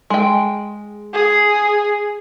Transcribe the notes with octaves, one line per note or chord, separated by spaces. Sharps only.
G#3 G5
G#4